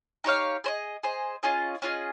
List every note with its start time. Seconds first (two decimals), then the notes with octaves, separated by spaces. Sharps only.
0.24 D#4 G4 C#5 F5
0.64 G#4 C5 D#5
1.03 G#4 C5 D#5
1.43 C#4 F4 G#4 D#5
1.82 C#4 F4 G#4 D#5